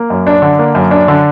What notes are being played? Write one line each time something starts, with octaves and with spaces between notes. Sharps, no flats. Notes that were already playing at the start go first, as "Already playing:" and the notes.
Already playing: A#3
F#2
D4
D3
A#3
F#2
D4
D3